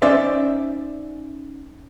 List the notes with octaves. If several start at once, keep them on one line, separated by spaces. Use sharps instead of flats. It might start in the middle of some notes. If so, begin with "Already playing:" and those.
C#4 D#4 C5 D5 E5